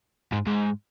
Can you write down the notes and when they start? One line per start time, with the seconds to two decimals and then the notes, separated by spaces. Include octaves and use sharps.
0.32 G#2
0.47 G#2